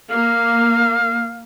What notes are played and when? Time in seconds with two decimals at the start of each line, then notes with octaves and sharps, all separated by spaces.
0.11 A#3 F5